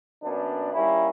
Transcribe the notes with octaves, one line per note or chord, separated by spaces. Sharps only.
F#2 A#3 B3 D4
G3 A#3 C#4 D#4 E4